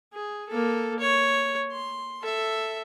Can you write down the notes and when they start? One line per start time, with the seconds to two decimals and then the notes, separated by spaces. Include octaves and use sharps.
0.13 G#4
0.49 A#3 A4
0.99 C#5
1.71 C6
2.22 A4 E5